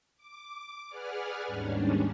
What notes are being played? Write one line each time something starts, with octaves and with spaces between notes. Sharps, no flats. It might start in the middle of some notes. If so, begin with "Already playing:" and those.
D6
G#4 B4 D5 F#5 G#5 F6
D#2 G#2 G3 C#4 D4